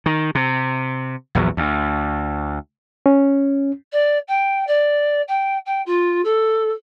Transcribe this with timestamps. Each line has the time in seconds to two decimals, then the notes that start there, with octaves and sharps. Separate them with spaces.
0.06 D#3
0.35 C3
1.35 A#1 E2 F#3
1.57 D2
3.06 C#4
3.92 D5
4.27 G5
4.67 D5
5.27 G5
5.65 G5
5.86 F4
6.24 A4